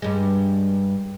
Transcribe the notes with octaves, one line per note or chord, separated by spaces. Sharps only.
G2 G#3